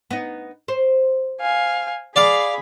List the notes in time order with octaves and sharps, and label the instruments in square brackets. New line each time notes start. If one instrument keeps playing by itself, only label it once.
[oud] B3 D#4
C5
[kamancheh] F5 G#5
[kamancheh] G#4 B5 [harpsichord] D5 F5